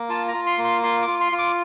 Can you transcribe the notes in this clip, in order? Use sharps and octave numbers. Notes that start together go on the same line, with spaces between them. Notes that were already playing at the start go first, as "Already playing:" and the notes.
Already playing: A#3
F4 A5
A#5
F4
C6
A#3
C6
F4 C6
D6
F4
C6
F4
D6